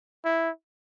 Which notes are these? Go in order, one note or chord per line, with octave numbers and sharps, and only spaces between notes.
E4